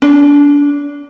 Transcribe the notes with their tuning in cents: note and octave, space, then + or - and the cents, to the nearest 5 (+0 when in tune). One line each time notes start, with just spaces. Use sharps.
D4 -30